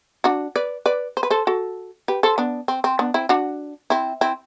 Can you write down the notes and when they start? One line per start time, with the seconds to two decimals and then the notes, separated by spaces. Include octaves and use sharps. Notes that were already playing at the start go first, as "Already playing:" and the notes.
0.24 D4 F#4
0.56 B4 D5
0.86 B4 D5
1.17 C5
1.23 B4
1.30 A4 C5
1.47 F#4 A4
2.08 G4 B4
2.23 A4 C5
2.38 B3 D4
2.68 C4
2.84 C4
2.99 B3 D4
3.14 C4 E4
3.29 D4 F#4
3.90 C4 E4
4.21 C4 E4